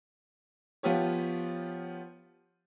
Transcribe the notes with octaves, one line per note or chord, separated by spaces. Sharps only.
F3 B3 F4 G4 C#5